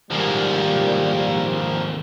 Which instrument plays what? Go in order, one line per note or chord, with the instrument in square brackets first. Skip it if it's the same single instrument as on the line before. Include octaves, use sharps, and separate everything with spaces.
[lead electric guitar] D#2 G#2 [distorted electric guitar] F3 A#3 [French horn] G3